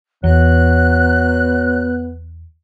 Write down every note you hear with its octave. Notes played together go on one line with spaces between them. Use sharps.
E2 F#3 B3 F#6